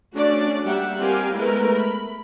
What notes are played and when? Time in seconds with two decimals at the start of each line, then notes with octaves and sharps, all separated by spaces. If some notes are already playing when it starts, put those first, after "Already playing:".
0.14 A3 C#4 D4 F#4 D5
0.64 G3 A#3 G4 E5 F#5
0.98 G3 C4 G4 A#4 F5 G#5
1.35 G#3 A3 B3 E4 A#4 B4
1.77 B5